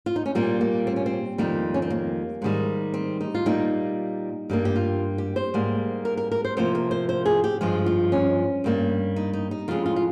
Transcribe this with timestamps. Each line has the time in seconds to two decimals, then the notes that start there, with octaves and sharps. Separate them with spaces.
0.06 F4
0.16 D#4
0.26 C#4
0.35 A#2 G3 A#3 C4
0.61 A#3
0.87 C4
0.96 C#4
1.06 C4
1.38 F2 D#3 G3 A#3
1.74 C#4
1.82 C4
1.90 A#3
2.42 G#2 D#3 G3
2.94 C4
3.21 D#4
3.35 F4
3.46 A#2 G3 A#3 D#4
4.50 G2 G3 A#3
4.65 G4
4.76 F4
5.18 G4
5.36 C5
5.54 G#2 G3 A#3
6.05 A#4
6.17 A#4
6.32 A#4
6.45 C5
6.57 C3 F3 A#3 C5
6.75 A#4
6.91 C5
7.09 C5
7.26 G#4
7.44 G4
7.61 G2 F3 G#3 F4
7.86 F4
8.12 C#4
8.64 G2 G3 A#3
9.16 D#4
9.33 D#4
9.51 D#4
9.68 F2 C#3 G#3 F4
9.86 F4
9.96 F4